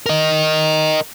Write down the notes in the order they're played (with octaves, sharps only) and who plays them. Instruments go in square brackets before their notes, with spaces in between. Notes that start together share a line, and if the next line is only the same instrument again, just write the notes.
[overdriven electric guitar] A#4 D#5